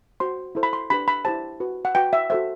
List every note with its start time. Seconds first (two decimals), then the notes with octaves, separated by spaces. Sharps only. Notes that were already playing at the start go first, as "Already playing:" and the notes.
0.20 F#4 C5 C6
0.55 E4 A4 C5
0.63 B5
0.73 C6
0.90 D4 G4 B4 B5
1.08 B5
1.25 E4 G4 C5 A5
1.60 F#4 B4
1.85 F#5
1.95 F#4 B4 G5
2.13 E5
2.30 F#4 A4 C5 E5